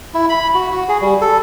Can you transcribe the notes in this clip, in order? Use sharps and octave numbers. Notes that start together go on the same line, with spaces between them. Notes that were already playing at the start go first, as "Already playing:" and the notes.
E4
B5
F#4
F#4
G#4
G3
A4